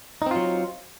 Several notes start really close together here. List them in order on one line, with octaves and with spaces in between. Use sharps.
D#4 C4 F4 F#3